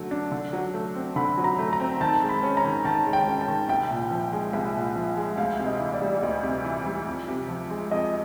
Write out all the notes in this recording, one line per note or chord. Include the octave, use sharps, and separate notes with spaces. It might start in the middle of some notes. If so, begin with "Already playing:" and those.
Already playing: D3 F#3 A3
D4
D3
F#3
A3
C4
D3 B5
F#3
A#5
A3
A#5
C4
D#3 A5
G#3
B5
C#4
A#5
D#3
D#3 A5
G#3
G5
C#4
A5
D#3
C2 G5
A#2
F3
G#3
C2
A#2
F3
G#3
D2 F5
C3
D#5
E3
D5
G3
D2 D#5
C3
E3
G3
F2
C3
F3
G#3
F2 D#5